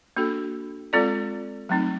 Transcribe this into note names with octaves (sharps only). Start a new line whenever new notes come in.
A#3 D4 F#4 A4
G#3 C4 F4 A4 D5
F#3 A3 C4 D#4